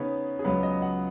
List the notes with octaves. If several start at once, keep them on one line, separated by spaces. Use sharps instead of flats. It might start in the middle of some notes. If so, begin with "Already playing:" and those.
Already playing: C#3 B3 D#4 B4 C#5
G#4
C#2 C#3 F#3 B3 B4
D#5
F#5